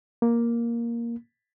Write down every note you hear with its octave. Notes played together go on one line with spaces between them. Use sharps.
A#3